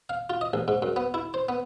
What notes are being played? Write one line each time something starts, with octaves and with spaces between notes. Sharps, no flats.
F5
F4
D#5
A1
G#2
F#2
B3
E4
C5
B3